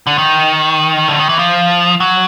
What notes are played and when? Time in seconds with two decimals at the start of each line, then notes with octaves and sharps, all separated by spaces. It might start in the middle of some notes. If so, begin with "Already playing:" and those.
0.07 D3
0.18 D#3
1.08 D3
1.19 D#3
1.29 E3
1.39 F3
2.00 F#3